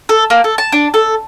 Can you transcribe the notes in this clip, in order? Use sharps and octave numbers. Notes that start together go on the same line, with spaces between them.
A4
A#3
A4
A5
D4
A4